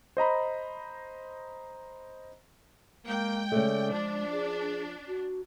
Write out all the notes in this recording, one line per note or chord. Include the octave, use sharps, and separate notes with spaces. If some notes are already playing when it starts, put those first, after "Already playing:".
C5 D#5 A#5 B5
G#3 A#3 G5
C#3 A3 D5
F3 D4
G#4
F#4